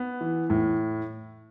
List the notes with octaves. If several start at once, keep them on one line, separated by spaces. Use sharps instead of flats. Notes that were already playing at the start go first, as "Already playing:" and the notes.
Already playing: B3
E3
A2